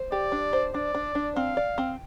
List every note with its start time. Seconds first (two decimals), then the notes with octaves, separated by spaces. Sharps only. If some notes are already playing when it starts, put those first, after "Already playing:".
Already playing: C5
0.12 G4 D5
0.32 D4
0.53 C5
0.74 D4 D5
0.94 D4
1.15 D4
1.36 C4 F5
1.57 D5
1.78 C4